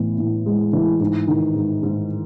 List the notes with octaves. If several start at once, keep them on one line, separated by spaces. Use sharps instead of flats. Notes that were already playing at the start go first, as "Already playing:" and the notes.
Already playing: A2 E3 B3
A2
G#3
E3
G#2
D#3
G#2
G#2